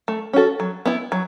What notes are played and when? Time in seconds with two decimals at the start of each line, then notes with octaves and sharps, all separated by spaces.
0.08 A3
0.33 C#4 F#4 A4
0.60 F#3
0.86 B3 E4
1.12 F#3